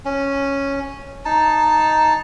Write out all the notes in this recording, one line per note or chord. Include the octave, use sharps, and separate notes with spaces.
C#4
D#4 A5